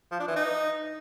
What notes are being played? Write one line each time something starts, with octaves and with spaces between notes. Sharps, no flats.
F3
D4
E3
D#4